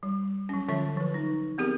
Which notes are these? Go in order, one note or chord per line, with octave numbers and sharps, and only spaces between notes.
G3
F#3 C#4
D3 F3 F4 E5 C#6
F3 B4
D#4
B3 C4 G4 G#4 A#4